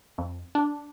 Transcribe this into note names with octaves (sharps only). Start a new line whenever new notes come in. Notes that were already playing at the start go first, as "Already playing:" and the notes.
F2
D4